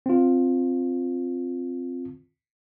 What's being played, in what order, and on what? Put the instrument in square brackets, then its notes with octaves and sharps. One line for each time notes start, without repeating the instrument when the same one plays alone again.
[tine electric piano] C4 F4